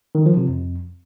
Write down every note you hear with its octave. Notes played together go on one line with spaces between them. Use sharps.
D#3
F3
C3
F2